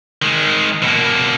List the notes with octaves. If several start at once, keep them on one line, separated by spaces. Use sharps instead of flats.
D#3 G#3
B2 A#3